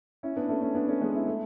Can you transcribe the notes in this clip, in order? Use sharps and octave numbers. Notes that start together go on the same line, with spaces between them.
C#4 E4
B3 D4
A3 C#4
A3 C#4
B3 D4
A3 C#4
G#3 B3
C#4 E4
A3